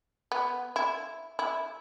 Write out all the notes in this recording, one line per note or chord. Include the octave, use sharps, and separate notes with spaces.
B3
E4
E4